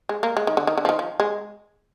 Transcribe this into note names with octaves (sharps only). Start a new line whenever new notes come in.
G#3
A#3
G#3
D#3
D3
D#3
D3
F3
D#3
F3
G#3